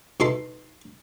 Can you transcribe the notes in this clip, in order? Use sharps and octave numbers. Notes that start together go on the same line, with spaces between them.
B2 D#4 E4 A4 C6